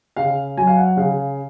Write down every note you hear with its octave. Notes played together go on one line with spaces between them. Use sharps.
C#3 F5
F#3 G#5
F5
F#5
C#3 F5